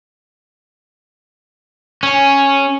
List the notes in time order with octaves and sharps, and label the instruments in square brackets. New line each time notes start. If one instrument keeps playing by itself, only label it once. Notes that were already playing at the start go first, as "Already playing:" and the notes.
[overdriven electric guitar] C#4 [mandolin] G#4 G#5